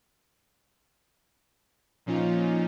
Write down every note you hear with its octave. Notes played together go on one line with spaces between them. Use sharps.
A#2 F3 C#4 D#4 F4